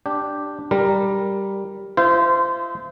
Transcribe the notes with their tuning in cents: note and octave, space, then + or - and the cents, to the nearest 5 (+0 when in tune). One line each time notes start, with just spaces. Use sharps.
D4 +0 G4 +0
G3 +0 A#4 +0
F4 -40 C5 -20 E5 -35